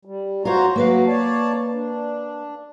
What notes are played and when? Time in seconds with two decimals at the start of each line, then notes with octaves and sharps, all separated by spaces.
0.05 G3
0.45 F4 F#4 C5 C#5 A#5
0.76 F#3 A#3 F#4 B4 F5
1.07 C#5 D5 A5
1.73 D4